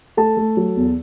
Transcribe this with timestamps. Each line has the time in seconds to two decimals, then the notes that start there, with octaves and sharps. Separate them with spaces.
0.17 A3 A4 A5
0.37 A3
0.57 F#3
0.76 E2